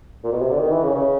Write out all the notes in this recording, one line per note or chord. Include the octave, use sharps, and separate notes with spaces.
A#2
B2
C3
D3
D#3
E3
C#3
C#3